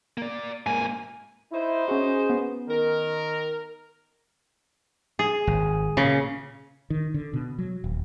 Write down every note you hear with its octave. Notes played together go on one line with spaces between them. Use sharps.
A#3 D5
G#2 A#3 G#5
D#4 E4 C5
C#4 F#4 G#4
B3
D#3 A#4
G#4
G#1
A#2 C#3
D#3
D3
B2
F#3
D#1